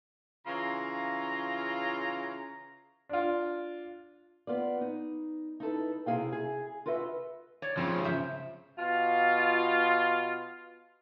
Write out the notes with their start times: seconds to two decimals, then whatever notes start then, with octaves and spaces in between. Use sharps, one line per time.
0.47 C#3 E3 F4 F5 A#5
3.09 D4 F4
4.47 B3 F4 D5
4.81 D#4
5.60 D#4 E4 A4 B4
6.06 C3 E4 G#4 F5 G5
6.32 G#4
6.86 F4 F#4 B4 D#5 E5
7.62 C#5 D5
7.77 C#3 F3 C4
8.04 C5 E5
8.77 B2 F4